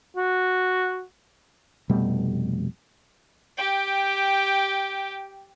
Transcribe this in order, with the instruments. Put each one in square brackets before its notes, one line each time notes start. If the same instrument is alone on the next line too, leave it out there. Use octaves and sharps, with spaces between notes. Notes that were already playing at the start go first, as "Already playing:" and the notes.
[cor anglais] F#4
[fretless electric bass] F1 B2 G3 A3
[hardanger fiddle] G4 G5